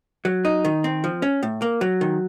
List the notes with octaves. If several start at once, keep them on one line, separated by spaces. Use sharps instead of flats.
F#3
D#4
D#3
C4
F3
C#4
A2
A#3
F#3
D#3